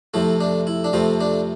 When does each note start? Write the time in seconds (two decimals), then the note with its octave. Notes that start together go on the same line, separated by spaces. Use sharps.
0.14 F2 C3 F3 A3 E4
0.40 D4
0.67 E4
0.84 D4
0.93 F2 C3 F3 A3 C4
1.21 D4